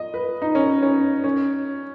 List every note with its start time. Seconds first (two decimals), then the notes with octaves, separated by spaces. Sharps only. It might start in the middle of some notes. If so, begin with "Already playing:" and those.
Already playing: D#5
0.14 B4
0.42 D#4
0.55 C#4
0.82 C#4
1.24 C#4